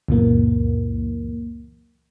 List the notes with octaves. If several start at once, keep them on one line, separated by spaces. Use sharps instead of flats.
C#2 F#2 A#2 E3 A#3